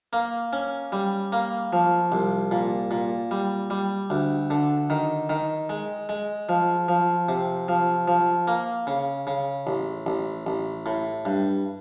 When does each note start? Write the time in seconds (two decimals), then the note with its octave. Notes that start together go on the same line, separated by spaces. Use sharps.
0.13 A#3
0.53 C#4
0.92 G3
1.32 A#3
1.73 F3
2.12 C2
2.51 A#2
2.91 A#2
3.31 G3
3.70 G3
4.10 D2
4.50 D3
4.90 D#3
5.29 D#3
5.69 G#3
6.09 G#3
6.49 F3
6.88 F3
7.29 C3
7.68 F3
8.08 F3
8.48 A#3
8.87 C#3
9.27 C#3
9.67 A1
10.06 A1
10.46 A1
10.86 A2
11.25 G2